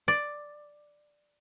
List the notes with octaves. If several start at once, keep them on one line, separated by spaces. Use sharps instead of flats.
D5